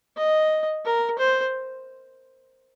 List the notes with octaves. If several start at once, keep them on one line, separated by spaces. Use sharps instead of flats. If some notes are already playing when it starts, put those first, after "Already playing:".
D#5
A#4
C5